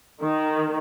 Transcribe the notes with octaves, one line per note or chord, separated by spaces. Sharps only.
D#3